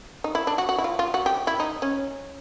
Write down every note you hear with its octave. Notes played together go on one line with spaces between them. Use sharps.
D#4
E4
D4
F#4
F#4
E4
F4
F4
F#4
G4
E4
D#4
C#4